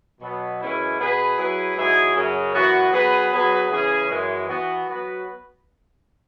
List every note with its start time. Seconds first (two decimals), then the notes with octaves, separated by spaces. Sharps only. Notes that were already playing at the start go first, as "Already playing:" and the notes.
0.21 B2 F#3 B3
0.60 F#2 E3 G#3 C#4 E4
0.99 B2 B3 G#4 B4
1.37 F#3 E4 G#4 B4
1.77 G#2 F#3 E4 G#4
2.15 F#2 C#3 F#3
2.53 F#2 E3 B3 F#4
2.92 F#3 B3 G#4 B4
3.31 F#3 B3 G#4 B4
3.70 C#3 E3 C#4 G#4
4.08 F#2 E3 G#3
4.47 E3 B3 F#4
4.86 F#3 B3 F#4 B4